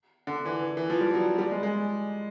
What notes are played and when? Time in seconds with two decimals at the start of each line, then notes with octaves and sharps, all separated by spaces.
0.27 D3
0.46 E3
0.77 E3
0.90 F3
1.01 G3
1.14 F#3
1.38 G3
1.51 G#3
1.63 G#3